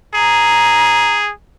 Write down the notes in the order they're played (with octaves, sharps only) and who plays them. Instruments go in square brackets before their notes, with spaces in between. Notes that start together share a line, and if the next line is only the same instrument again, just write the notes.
[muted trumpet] G#4 [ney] A#5